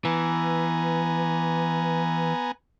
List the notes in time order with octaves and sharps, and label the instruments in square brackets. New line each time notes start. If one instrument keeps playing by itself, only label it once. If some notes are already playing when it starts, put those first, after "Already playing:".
[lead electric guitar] E3 [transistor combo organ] B3 G#5 A#5